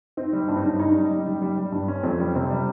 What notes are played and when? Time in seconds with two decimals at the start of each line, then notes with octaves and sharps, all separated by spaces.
0.17 C4 D#4
0.33 G3
0.48 G2
0.56 D#4
0.64 G2 C#4
0.79 D#4
0.96 G3
1.11 G3
1.26 G3
1.42 G3
1.57 G3
1.72 G2
1.88 C#4
2.03 F2 C4
2.19 G3 C#4
2.35 C3 C4
2.50 G3